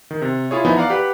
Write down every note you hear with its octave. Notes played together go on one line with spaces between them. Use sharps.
D#3
C3
E4 F4 G#4 C#5
E3 F3 B3 D#4 E4
D5 F5 F#5 A#5
G4 B4 F#5